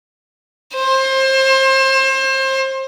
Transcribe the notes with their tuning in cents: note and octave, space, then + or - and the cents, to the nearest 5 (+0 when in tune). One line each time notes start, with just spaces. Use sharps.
C5 +30